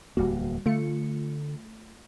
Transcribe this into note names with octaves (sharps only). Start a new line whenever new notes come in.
D1 E2 G3 A#3 F#4
D3 A3 F4 C#7